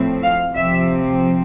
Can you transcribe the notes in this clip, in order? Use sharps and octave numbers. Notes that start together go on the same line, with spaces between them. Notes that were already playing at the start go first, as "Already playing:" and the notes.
Already playing: A2 F3 A3 C4
F5
C3 F3 C4 E5